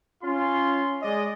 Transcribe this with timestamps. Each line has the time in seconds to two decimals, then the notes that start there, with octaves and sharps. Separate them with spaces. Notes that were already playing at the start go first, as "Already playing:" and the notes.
0.23 C#4 F4 C6
1.03 G#3 D5 D#5